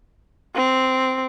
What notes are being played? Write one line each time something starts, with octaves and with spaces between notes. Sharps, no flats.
C4